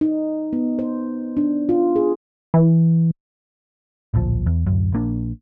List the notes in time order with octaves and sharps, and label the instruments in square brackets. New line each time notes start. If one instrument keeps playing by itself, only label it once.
[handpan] D#4
B3
C5
D4
F4
G#4
[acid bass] E3
[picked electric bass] D1 A#1 G#2 F3
E2
D1 G#1 F#2
A#1 A#3 D4